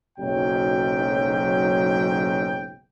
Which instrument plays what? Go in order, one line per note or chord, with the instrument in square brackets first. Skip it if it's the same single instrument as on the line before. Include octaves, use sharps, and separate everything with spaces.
[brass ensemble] F#1 B1 G#2 F#3 G5